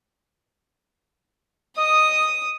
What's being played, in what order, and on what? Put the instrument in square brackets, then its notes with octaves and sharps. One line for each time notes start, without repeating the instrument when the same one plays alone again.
[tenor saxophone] D#5 [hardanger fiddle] D#6